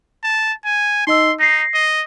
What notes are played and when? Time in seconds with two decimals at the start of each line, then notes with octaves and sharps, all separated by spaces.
0.24 A5
0.65 G#5
1.07 D#4 D#5 C6 E6
1.39 D#4 A#6 C7
1.74 D#5